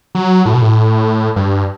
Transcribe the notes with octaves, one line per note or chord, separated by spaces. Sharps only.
F#3
A2
B2
A2
G2